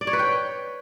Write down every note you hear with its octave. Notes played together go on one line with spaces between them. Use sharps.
D5
C#5
B4
G5